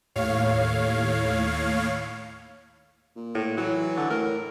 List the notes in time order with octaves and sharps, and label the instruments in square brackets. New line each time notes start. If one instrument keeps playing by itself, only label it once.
[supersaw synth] D#2 A2 C#5 F5
[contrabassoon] A#2
[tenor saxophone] A2
[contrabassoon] E3 [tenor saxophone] F#3
[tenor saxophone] D3
[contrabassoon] A2 [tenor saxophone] A#4